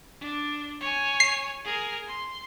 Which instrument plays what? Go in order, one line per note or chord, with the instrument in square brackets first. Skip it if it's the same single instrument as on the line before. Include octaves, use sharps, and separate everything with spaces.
[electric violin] D4
C#5 G#5
[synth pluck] C7
[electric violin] G#4 A#4
C6